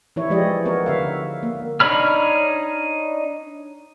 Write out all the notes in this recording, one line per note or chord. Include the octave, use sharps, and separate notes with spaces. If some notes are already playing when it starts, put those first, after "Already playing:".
E3 E4 C#5
E3 F3 G#3 G4 D5 D#5
B3 A#4 C#5
D3 E5 F5
A#3
D4 D#4 C#5 B5 F6